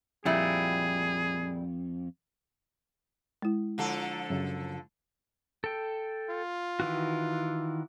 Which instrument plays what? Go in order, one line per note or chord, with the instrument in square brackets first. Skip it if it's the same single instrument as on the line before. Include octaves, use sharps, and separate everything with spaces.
[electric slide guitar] F2 [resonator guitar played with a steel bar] A#2 G3 E4 [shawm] G#4
[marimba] G#3 E4
[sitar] D3 F3 A4
[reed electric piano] F#2 C#3
[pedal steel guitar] A4 G5
[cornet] F4
[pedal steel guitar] D#3 E3 F#4